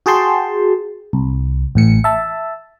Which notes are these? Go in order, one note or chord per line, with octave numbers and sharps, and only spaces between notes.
F#4 G#4 G5 A5 C6
C2
A1 A2 C#7
E5 A5